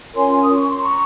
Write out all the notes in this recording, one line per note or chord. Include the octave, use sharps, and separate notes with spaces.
C#4 F4 A#4 C#5 G#5 C6
D#6
C#6
C6
A#5 C#6